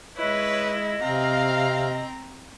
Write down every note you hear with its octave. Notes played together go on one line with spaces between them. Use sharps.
G#3 E4 B4 C#5 D#5
C3 C4 F5 A#5